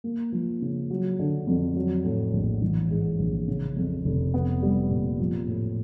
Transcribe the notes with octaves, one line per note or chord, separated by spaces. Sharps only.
A#3
F3
C#3
F#3
D3
F2
F#3
A2
A#1
E3
G#2
A#1
C#3
F2
F1
B3
G3
A#2
F3
A2